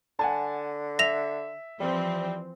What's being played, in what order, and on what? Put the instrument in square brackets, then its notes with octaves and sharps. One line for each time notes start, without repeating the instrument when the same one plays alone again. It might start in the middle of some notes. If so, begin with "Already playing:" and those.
[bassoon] D3 [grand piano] F#5 G#5 A5
[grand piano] E5 [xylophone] A#6 F7
[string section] E3 F3 C4 [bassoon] G3